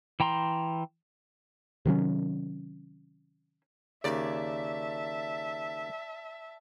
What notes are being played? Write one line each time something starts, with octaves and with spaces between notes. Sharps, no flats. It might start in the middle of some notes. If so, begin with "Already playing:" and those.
E3 G5 A#5 C6
C3 D#3 F#3 C#4
D#2 C#3 D5 E5 A5